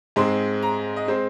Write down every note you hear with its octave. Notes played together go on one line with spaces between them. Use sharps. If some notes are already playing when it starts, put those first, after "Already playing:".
G#2 G#3 C4 C6
A#5
D#5
G#3 C4 C5